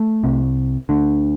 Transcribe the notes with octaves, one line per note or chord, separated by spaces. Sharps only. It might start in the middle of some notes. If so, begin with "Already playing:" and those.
Already playing: A3
C2 C3
D2 D3